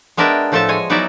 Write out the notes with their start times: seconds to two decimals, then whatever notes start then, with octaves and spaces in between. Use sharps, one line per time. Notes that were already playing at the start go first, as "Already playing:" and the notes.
0.17 G#3 B3 D4 A#4 E5 G5
0.52 A2 F3 A3 A4 E5 A5
0.68 G#3 C#5 G#5
0.90 F#3 B3 D#4 E4 D5 E5